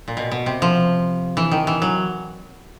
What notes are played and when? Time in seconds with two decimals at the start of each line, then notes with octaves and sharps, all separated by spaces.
0.08 A#2
0.17 B2
0.31 B2
0.46 C3
0.62 F3
1.37 E3
1.51 D#3
1.67 E3
1.82 F#3